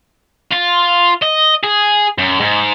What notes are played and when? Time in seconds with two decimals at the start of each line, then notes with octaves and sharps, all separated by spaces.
0.51 F4
1.22 D#5
1.64 G#4
2.18 F#2
2.40 G#2